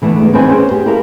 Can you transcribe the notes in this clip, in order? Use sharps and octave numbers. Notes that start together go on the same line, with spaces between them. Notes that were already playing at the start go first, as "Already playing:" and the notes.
D3 E3 A3 B3
E2 D3 G#3
E3 C4 D#4 B4 G5 G#5
B3 C#4 G#4 C5
G4 G#4
E4 G4 A4 A#4 F5